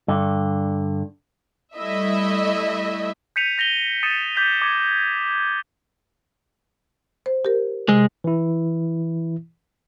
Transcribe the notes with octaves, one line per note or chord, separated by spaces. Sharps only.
G2 D3
G3 A3 E4 D#5 E5
G6 B6 C#7 D#7 F7
G6 A#6 F7 G7
D#6 A6 C#7 D#7 E7
D6 G6 B6 D#7
D6 G#6 C#7
C5
G4 A#4
C3 G#3
E3 E4